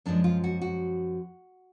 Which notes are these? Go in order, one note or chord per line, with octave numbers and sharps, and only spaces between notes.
F#2 F3 G#3 D4
F4
F#4
F#4